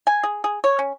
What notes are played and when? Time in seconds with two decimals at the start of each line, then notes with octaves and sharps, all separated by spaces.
0.07 G#5
0.23 G#4
0.44 G#4
0.64 C#5
0.79 C#4